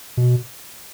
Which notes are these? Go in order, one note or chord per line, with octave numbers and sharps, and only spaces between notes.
B2